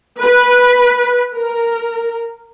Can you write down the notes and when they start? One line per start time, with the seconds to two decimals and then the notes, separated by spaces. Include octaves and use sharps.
0.20 B4
1.34 A#4